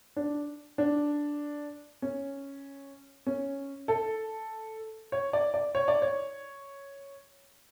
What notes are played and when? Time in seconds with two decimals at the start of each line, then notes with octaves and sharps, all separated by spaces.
0.16 D4
0.78 D4
2.02 C#4
3.27 C#4
3.88 A4
5.12 C#5
5.33 D5
5.54 D5
5.75 C#5
5.88 D5
6.02 C#5